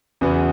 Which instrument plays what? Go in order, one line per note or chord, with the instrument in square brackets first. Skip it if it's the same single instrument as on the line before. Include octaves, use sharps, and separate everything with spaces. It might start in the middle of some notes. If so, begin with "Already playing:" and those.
[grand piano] E2 C#3 E3 B3 F#4